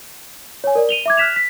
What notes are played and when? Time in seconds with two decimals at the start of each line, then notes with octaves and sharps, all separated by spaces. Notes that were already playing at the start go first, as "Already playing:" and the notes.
0.64 C#5 G#5
0.75 A#4 D5
0.89 D#7 F7 G7
1.06 E5 D6 G#6
1.17 F6 F#6 B6 E7 F7
1.36 B6